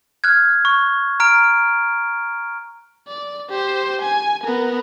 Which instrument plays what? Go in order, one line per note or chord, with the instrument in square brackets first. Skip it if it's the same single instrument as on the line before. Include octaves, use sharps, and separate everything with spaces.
[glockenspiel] F6 F#6 G#6
C#6
A#5 F6 D7
[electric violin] D5
G4 C5
G#5
B3 A#4